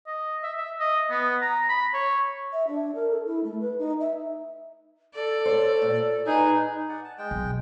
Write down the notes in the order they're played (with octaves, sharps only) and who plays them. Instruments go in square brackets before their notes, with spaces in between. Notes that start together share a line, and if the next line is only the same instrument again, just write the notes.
[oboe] D#5
E5
E5
D#5
B3
A#5
B5
C#5
[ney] E5
D4
A#4
A4
E4
A3
B4
D#4
E5
[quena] A4 [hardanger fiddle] D5
[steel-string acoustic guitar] C5 C#5
A#2
[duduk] D#4 [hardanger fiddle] G#4 [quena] B4
[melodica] D5 F#5
A5
G#3 G5
[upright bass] B1